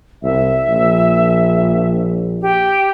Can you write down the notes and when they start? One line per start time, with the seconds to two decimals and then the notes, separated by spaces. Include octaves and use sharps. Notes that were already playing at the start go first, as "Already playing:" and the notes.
0.23 C2 E5
0.68 A#1
2.41 G4